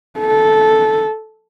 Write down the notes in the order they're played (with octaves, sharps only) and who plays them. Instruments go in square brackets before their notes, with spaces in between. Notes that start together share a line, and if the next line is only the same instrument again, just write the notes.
[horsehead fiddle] A4